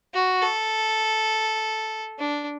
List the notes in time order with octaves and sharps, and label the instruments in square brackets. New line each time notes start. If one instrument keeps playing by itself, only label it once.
[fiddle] F#4
A4
D4